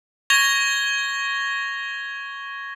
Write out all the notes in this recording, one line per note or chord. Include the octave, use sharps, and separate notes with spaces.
C#6 G#6 A#6 F7 G7